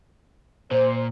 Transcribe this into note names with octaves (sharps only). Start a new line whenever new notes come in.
A#2 C5